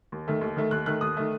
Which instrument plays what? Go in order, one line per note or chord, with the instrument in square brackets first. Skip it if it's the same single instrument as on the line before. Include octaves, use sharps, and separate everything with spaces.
[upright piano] D#2
D#3 A3
D#2
D#3 A3
D#2 F#6
D#3 A3 F#6
D#2 D#6
D#3 A3